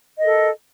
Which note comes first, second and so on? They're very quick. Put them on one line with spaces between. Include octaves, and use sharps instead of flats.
D#5 A#4 A4